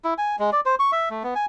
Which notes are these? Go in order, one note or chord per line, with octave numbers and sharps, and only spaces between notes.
E4
G#5
G#3
D5
C5
C#6
E5
A3
B3
G#5